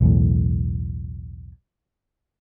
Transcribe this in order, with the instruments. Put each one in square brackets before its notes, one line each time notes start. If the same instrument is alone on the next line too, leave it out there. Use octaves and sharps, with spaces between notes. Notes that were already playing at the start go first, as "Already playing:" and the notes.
[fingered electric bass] B1 E2 A2